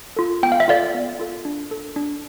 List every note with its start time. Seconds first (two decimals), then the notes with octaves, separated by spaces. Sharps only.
0.16 F4 A4
0.43 B3 G5
0.52 F5
0.60 E5
0.68 F4 A4 D5 F5
0.94 B3
1.19 F4 A4
1.45 D4
1.71 A4
1.96 D4